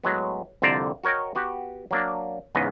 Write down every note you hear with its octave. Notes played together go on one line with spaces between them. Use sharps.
A2 F#3 G#3 B3
C2 F2 D3 C5 D5 A#5
F#4 A#4 C#5 D#5 G5
B3 F#4 G4
F#3 A#3 D4
E2 G#2 C#3 B3 D#5